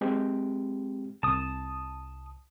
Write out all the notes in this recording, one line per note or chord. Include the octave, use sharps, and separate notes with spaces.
G#3 C4 G4
C2 A5 D#6